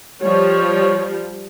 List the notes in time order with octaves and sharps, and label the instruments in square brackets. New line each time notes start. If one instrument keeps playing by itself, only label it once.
[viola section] F3 G3 [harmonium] C#5